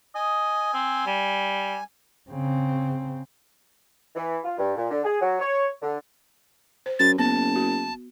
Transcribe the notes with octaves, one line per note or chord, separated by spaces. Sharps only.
D#5 G#5
C4
G3
C#3 C4
E3
F4
G2
A#2
D3
G#4
F#3
C#5
D3
C5
F#2 A6
F#1 B3 A5
F#4